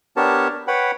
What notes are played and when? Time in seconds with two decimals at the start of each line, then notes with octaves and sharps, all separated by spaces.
0.16 B3 D4 G4 A#4 C#5 A5
0.68 B4 C#5 F#5 G5 B5